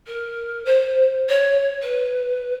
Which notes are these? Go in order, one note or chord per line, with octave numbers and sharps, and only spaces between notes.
A#4
C5
C#5
B4